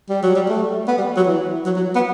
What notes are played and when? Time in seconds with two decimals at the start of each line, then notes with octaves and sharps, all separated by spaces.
0.09 G3
0.23 F#3
0.35 G3
0.49 A3
0.88 B3
0.98 G3
1.17 F#3
1.27 E3
1.66 F#3
1.76 F#3
1.95 B3